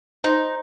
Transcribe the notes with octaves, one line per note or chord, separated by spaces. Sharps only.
D#4 C5 D#5 A#5